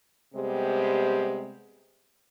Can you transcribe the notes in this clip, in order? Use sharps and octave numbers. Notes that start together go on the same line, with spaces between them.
C3 G3 G#3 B3 G4 C5